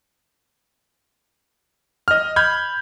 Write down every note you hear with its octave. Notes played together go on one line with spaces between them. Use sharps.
D#5 F6
B5 F6 G6 G#6